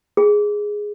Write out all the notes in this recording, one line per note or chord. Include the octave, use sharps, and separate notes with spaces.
G#4